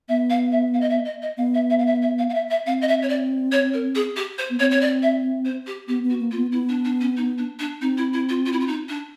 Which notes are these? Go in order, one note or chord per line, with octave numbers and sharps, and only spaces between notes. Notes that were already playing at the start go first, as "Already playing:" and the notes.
B3 E5
F5
E5
F5
D#5
E5
D#5
D#5
B3 F5
E5
E5
F5
E5
E5
F5
F5
E5
E5
C4 F5
D#5
E5
C#5
D5
C#5
A#4
G#4
G4
C5
B3
C4 C#5
C#5
D5
E5
C5
G4
B3 G4
B3
F#4
A#3
F4
B3
B3 E4
D4
D4
C#4
D#4
D4
D4
C4 D#4
E4
E4
F4
F4
E4
F4
D#4
D4